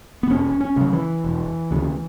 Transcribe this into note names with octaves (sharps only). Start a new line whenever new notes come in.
B3
E1 C#4
C#4
D2 C#3 F#3
E3
E1
D2 C#3